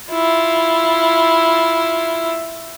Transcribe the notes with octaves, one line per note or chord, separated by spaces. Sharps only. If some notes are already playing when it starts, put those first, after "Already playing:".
E4 F4